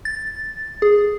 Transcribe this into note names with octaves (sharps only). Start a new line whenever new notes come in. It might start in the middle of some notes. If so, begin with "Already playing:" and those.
A6
G#4